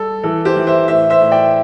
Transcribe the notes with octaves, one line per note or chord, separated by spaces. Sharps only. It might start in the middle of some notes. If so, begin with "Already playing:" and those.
Already playing: G3 A4
E3 A4
G4 C5
E3
C5 E5
A2 C5 E5
C5 E5
A2
D5 G5